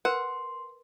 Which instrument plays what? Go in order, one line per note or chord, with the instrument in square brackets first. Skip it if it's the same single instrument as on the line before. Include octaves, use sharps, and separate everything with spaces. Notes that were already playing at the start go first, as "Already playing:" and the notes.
[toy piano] A#4 B4 [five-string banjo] F#5 [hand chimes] C6